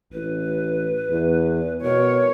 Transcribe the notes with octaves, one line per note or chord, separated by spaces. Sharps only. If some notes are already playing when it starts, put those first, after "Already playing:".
A1 B4
E2
B2 A#4 C#5